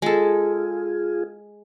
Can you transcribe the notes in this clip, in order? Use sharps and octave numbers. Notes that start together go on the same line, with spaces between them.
G#3 F4 G#4 A4